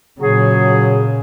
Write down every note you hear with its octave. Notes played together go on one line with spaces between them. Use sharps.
A#2 C#3 F#3 G#4